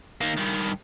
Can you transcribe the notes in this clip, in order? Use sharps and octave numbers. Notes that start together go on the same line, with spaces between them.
D#3 A#3
G2 D#3